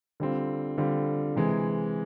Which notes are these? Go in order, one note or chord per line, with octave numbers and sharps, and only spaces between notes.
D3 G3 C4 F4
D3 G3 C4 F4
C3 E3 G#3